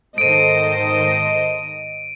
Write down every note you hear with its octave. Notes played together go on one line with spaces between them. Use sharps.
G#2 D#3 A4 C5 D#5 D7 D#7